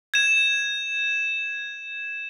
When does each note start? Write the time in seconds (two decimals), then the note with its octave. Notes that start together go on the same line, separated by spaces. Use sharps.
0.14 G#6 E7